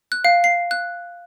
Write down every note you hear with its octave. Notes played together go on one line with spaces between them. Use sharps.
F#6
F5
C7
F#6